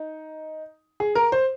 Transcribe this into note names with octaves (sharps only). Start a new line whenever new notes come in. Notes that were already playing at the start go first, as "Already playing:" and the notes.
Already playing: D#4
G#4
A#4
C5